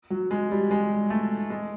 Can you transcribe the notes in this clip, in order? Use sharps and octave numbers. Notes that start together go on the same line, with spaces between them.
F#3
G#3
G3
G#3
A3
G#3